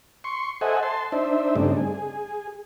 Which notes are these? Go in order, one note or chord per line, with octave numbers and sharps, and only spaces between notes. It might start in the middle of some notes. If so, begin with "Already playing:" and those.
C6 C#6
A4 C5 D#5 E5 F#5 G#5
A5 C6
D4 D#4 C5 E5
G2 C#3 A3 C4 D4 D#4
G#4